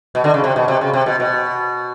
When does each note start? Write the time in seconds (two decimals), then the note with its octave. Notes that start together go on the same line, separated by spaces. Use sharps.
0.15 B2
0.24 D3
0.34 C#3
0.44 C3
0.56 B2
0.68 C3
0.81 C#3
0.94 C3
1.06 B2
1.20 B2